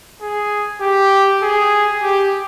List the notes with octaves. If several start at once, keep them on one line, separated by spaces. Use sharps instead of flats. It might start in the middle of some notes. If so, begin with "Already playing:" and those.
G#4
G4
G#4
G4